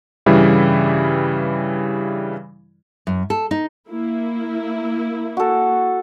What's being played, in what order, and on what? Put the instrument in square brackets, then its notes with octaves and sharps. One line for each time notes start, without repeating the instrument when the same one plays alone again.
[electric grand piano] G2 C#3 E3 G3 E4
[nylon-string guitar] F#2
A4
D#4
[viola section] A#3 E4
[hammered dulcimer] F#4 A4